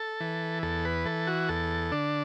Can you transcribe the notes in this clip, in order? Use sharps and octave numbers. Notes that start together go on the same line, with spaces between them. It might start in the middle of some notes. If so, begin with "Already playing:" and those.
Already playing: A4
E3
E2 A4
B4
E3 A4
F#4
E2 A4
D3 D4